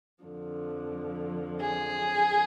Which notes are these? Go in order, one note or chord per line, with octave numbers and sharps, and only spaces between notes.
F2 D3 F3
G#4